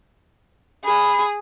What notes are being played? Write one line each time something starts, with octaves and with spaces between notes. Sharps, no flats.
G#4 B5